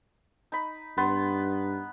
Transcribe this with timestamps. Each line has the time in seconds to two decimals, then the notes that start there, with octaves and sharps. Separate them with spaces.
0.52 D#4 B5
0.97 G2 B3 B4 C6